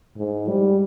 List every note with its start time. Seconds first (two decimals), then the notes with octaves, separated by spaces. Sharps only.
0.16 G#2
0.49 G3